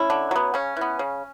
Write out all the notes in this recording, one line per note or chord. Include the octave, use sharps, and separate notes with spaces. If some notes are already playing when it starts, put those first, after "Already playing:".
Already playing: C#4 E4
D3
F#3 B3
C#3 C#4
E3 B3
C#3